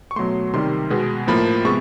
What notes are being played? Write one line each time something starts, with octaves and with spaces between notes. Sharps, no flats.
C#6
B2 F#3 A3 C6
C3 D#3 G3 C6
B2 G#3 B3
A2 F3 A#3 B5
C3 G#3 B3 C#6